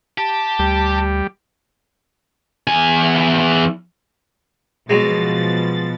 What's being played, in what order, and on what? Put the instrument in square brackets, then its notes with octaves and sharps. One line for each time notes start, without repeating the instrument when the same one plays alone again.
[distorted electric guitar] G4 [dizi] A5
[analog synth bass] D2 [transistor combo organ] G3
[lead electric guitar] E2 G#5
[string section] B2 F3 A6 [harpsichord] F#3 G#3